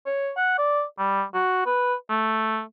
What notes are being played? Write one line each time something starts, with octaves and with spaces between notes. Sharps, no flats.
C#5
F#5
D5
G3
F#4
B4
A3